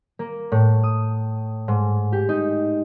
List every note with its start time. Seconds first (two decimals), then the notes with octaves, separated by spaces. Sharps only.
0.19 A#3
0.52 A2
0.83 D#6
1.68 G#2
2.12 G4
2.29 D#4